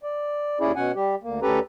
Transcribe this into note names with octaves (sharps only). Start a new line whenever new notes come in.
D5
D#2 C#4 E4 G#4 D5
B2 C#4 F#5 G#5
G3 G4
D2 A#3
D2 C#4 G4 A4 B4 A#5